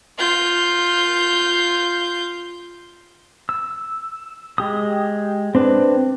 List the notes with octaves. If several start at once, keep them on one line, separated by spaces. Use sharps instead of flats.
F4 G6
E6
G#3 G4 D#6
C4 D4 B4